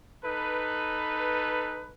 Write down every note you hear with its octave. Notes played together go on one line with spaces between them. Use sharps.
D#4 A4 B4